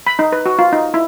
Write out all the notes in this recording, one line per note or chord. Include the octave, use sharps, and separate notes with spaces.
B5
D#4
B4
F#4
F4
D#4
E4